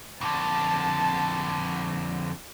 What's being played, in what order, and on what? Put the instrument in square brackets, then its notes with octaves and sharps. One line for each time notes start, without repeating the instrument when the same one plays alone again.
[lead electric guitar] F2 D3 [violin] A5